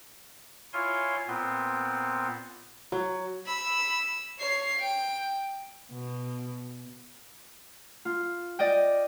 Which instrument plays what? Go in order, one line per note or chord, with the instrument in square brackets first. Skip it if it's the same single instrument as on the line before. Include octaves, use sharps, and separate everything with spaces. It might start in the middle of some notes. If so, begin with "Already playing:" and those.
[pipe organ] E4 F4 C#5 F5 G#5 C6
A#2 B3 C4
[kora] F#3
[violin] B5 E6
C#5 C7
G5
[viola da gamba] B2
[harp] F4
D5 D#5 G5